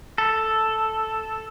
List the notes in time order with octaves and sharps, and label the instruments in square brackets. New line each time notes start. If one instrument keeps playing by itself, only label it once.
[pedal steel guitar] A4